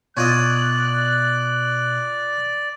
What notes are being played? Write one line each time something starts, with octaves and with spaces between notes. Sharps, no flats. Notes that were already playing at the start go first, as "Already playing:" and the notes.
B2 C#4 F4 D5 D#5 F#6